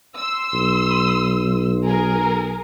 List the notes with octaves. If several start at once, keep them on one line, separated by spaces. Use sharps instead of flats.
C6 E6
B1
G#4 A#4